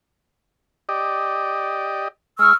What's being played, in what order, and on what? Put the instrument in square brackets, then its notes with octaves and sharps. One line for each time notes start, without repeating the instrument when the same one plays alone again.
[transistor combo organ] G4 D5 D#5
[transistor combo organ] G#3 [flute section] C#6 E6 F6